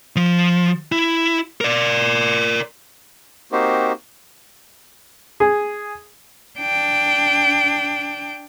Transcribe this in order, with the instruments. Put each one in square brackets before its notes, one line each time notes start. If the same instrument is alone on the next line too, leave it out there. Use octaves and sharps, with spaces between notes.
[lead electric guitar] F3
E4
A#4 D5
[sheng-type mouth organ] A#3 C4 D#4 F#4 G4 C5
[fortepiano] G#4
[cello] D4 G5